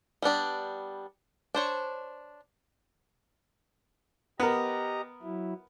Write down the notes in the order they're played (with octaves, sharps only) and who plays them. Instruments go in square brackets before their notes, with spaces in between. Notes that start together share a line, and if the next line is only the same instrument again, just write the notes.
[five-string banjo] G3 B3 D4 G4
D4 C5 C#5
[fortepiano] B3 A#4 [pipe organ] G4 D#5 A#5
[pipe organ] F#3 E4